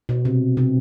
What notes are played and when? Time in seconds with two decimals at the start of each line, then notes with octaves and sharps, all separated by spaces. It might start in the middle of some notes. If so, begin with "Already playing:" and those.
0.09 B2
0.25 C3
0.57 C3